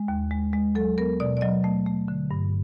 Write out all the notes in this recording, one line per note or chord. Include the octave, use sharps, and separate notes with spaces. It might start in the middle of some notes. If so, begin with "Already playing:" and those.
Already playing: G#3
D#2
G#3
G#3
F#3 A4
B3 A#4
B2 D5
D5
F#3 D#5
A3
A3
D3
G2